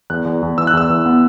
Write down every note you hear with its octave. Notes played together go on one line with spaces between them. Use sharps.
E2 F#6
E2
E2
E3 E6
F#6
E2 E6
E3
B3